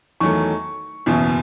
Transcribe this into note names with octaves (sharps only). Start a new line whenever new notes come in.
E2 D#3 F#3 A3 C#6
F#1 E2 B2